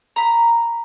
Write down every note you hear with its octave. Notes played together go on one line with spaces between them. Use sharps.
A#5 B5